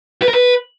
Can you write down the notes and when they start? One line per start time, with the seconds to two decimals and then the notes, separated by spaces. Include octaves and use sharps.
0.22 B4
0.28 A#4
0.34 B4